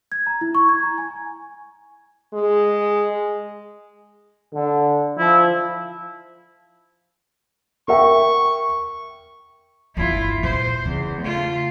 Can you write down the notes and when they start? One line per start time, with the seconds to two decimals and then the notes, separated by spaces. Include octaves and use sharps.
0.12 G#6
0.27 A#5
0.41 E4
0.55 C#6
0.69 G#6
0.83 A#5
0.98 G#5
2.33 G#3
4.54 D3
5.19 F3 E4
7.88 A#4 E5 G5 C#6
9.97 G1 E2 E4 F4
10.43 A#2 C5
10.85 E2 C#3
11.21 A3 F4